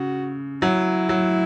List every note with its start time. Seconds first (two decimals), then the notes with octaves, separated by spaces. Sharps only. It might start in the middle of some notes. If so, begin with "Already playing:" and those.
Already playing: C#3 F#4
0.62 F#3 E4
1.09 F#3